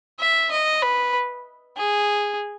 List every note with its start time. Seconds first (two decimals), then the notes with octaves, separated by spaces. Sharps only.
0.19 E5
0.51 D#5
0.82 B4
1.77 G#4